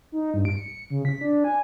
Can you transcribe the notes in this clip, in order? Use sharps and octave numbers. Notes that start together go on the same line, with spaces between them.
D#4
G2
D7
C#7
C#3
B6
D4
G#5